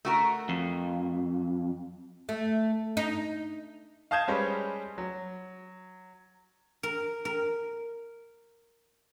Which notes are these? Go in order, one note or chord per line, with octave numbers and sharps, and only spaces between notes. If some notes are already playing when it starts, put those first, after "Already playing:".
A3 F#4 A#4
F2
A3
D#4
F5 A5 D#6 G6 G#6 E7
G3 G#3 C#4 B4 C5
F#3
A#4
A#4